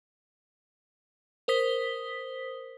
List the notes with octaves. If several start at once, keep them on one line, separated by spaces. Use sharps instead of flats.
A#4 C5 D#6 B6 G7